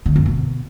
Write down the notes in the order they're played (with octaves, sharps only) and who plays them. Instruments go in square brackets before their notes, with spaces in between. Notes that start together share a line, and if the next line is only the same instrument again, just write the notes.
[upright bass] D3
F#2
B2